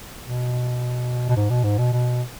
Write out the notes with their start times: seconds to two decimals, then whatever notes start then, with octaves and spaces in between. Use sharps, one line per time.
0.24 B2
1.29 B2
1.36 G#2
1.50 B2
1.64 G#2
1.79 B2
1.93 B2